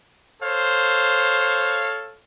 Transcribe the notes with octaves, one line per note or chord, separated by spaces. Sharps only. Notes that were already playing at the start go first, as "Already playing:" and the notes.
A4 C5 C#5 F5